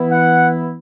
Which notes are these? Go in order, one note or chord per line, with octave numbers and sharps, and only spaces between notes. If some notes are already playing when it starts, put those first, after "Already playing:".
Already playing: E3 B3 E4
F#5